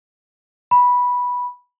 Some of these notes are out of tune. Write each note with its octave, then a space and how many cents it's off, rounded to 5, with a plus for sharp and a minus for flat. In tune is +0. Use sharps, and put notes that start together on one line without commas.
B5 -10